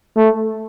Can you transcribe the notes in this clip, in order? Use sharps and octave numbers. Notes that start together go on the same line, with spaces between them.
A3